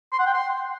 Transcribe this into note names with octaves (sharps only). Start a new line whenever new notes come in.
C6
F#5
G5
C6